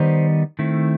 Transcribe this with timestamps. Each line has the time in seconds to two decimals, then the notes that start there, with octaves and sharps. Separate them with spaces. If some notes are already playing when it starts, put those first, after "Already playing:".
Already playing: D#3 G3 B3 D#4 C5
0.59 D#3 A3 C4 E4